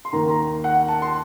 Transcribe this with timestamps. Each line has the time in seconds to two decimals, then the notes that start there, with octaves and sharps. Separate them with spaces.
0.05 C6
0.13 D#2 D#3 A#3 A#5
0.30 A#5
0.64 F#5
0.88 A5
1.02 C6